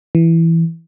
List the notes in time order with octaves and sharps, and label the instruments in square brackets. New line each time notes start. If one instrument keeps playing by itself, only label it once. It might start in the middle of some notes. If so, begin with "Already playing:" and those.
[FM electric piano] E3